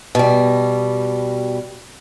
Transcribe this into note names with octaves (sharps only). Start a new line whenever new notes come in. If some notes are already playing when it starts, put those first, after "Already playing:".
B2 G3